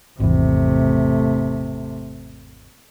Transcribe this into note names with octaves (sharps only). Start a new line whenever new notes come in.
G#1 E2 C3 A3